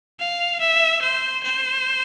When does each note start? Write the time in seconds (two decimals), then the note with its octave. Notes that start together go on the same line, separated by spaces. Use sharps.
0.20 F5
0.60 E5
1.01 C5
1.43 C5